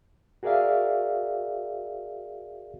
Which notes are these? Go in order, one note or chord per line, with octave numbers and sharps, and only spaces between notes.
F#4 G#4 A#4 D5 E5 F5